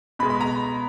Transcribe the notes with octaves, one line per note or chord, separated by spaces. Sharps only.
B2 G#3 B5
B5
A#5